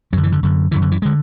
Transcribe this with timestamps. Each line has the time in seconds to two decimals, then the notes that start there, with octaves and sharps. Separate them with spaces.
0.13 F#2 F#3
0.17 D3
0.23 E3
0.32 D3
0.43 F#2 D3
0.71 D3 E3
0.75 F#2
0.82 D3
0.91 E3
1.02 D3 G#3